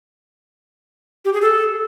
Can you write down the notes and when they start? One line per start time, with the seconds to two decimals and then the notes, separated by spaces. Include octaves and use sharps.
1.25 G4
1.33 G#4
1.42 A4